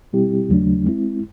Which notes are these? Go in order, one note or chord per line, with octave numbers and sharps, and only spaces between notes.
B2 G3 C4 E4 G4
D#2 C#3 F#3 A3 D4
G#3 C4 E4